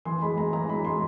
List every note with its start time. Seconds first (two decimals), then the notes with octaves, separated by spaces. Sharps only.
0.05 E3 C6
0.22 G#3 B5
0.37 G#3 A#5
0.53 E3 A#5
0.69 G#3 B5
0.85 G#3 C6